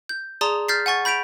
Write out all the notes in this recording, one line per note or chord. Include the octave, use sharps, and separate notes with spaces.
G6
G#4 D5 A5 A#5 C6 D#6
F6 G6 A6 B6 C7
F#5 G#5 C#6 A6
B5 G6 B6 D7 F7